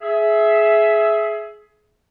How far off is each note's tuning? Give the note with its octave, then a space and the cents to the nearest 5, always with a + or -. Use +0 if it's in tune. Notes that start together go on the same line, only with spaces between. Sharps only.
G#4 +25 E5 +0